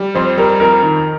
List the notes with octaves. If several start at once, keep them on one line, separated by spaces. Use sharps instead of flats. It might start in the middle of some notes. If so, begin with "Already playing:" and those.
Already playing: G3
F2 C5
G3 A#4
F2 A#4
D#3